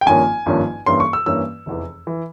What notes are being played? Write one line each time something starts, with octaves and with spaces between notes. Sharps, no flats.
G5
G#1 G2 F3 A#3 C#4 G#5
G#1 G2 F3 A#3 C#4
G2 E3 A#3 C#4 C6
C#6
E6
G2 E3 A#3 C#4 E6
F1 E2 E3
E3